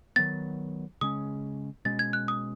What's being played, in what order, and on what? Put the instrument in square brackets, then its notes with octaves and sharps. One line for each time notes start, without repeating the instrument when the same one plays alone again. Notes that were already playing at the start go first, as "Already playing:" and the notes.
[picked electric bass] D#3 F#3 B3 [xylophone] A6
[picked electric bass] C#3 G#3 C#4 [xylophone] D#6
[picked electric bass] B2 G#3 C#4 [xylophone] A6
[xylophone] G#6
F#6
D#6